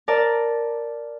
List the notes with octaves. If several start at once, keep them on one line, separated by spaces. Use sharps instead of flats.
A#4 D5 A5